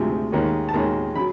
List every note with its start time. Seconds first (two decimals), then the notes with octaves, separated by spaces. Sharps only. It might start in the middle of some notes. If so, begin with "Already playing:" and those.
Already playing: D2 C3 F3 G#3
0.32 D#2 D#3 G#3 C#4
0.69 A5
0.74 D#2 D#3 G#3 C#4 A#5
1.15 C#3 F#3 B5